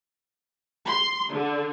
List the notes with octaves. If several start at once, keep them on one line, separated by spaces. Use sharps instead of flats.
C6
D3